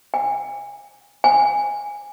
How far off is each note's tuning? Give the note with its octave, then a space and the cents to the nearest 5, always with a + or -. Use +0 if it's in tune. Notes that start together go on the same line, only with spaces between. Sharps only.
G#5 -30
G#5 -10